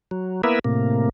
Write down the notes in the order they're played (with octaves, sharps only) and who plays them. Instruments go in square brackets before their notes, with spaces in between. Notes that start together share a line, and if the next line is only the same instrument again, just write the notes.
[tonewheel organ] F#3
A#3 B3 E4 A#4 B4 E5
A2 C3 A#3